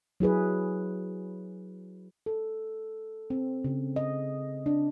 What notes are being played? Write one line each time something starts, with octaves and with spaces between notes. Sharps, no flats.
F#3 E4 G#4 B4
A4
C4
C#3
D#5
D4